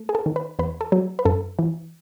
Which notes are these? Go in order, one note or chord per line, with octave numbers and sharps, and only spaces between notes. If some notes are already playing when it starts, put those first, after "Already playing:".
Already playing: A3
G#4
A4
D#3
B4
E2 B4
A4
F#3
B4
F#2 A4
E3